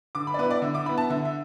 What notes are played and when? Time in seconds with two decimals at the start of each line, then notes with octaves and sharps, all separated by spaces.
0.15 D3 D6
0.27 B5
0.34 D5
0.39 B3 E4 B4
0.51 D5
0.62 D3 E5
0.74 D6
0.86 E4 B5
0.89 B3
0.98 A5
1.10 D3 E5
1.25 E5